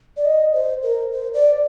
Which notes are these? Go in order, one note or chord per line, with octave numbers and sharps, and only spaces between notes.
D5
D#5
C5
A#4
C5
D5